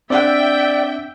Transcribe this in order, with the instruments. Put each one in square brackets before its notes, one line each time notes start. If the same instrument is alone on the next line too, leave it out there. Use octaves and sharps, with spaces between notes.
[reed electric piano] C4 D4 F#5 [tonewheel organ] D5 [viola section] E5 G5